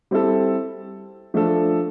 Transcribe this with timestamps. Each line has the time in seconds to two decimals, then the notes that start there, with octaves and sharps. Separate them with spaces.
0.11 G3 C4 E4 A4
1.34 F3 A3 D4 A4